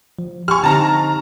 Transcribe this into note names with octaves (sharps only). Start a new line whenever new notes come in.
F3
G4 G#5 C#6 F6
D3 C4 D#4 A5 A#5